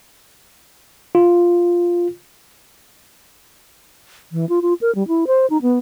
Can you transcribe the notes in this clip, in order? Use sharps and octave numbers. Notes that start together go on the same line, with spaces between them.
F4
E3
F4
F4
A#4
G3
E4
C5
D#4
B3